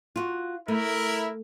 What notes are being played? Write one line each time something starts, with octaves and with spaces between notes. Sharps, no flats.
F4 F#4
A3 E4 A#4